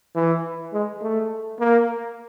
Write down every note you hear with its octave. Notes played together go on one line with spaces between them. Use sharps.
E3
G#3
A3
A#3